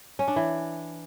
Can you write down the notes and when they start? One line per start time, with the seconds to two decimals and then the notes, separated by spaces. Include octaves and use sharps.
0.19 C#4
0.28 D4
0.36 E3